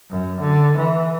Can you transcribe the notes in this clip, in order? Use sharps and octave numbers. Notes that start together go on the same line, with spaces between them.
F#2
D3
E3